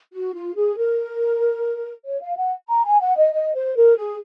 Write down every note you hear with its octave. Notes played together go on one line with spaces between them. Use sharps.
F#4
F4
G#4
A#4
C#5
F5
F#5
A#5
G#5
F#5
D#5
D#5
C5
A#4
G#4